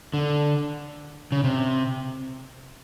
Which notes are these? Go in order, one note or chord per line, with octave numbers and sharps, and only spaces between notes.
D3
C#3
C3